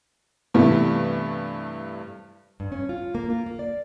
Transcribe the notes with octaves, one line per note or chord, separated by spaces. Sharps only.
G2 C3 E3 A3 B3
G2
C#4
F4
A#3
F4
A#3
D5